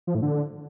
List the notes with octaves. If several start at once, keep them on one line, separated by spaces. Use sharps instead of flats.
F3
A2
D3